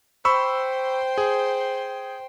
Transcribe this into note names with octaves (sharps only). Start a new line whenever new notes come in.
C5 G5 B5 C#6 E6
G#4